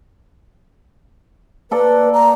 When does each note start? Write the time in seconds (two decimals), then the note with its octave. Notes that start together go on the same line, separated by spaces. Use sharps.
1.71 A#3 A4 B4 D5
2.13 A#5